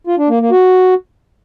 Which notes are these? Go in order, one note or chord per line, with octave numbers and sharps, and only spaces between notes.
F4
D4
A#3
A#3
F#4